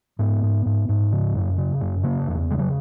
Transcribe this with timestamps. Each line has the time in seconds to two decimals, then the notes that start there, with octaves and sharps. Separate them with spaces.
0.19 G#2 B3
0.43 G#2
0.66 G#2
0.89 G#2
1.12 C#3
1.35 F#2
1.58 C#3
1.81 F#2
2.03 C#3 A#3
2.27 E2
2.50 C#3 G#3
2.59 F#3